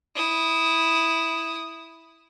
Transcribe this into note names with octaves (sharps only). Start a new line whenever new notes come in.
E4 D#6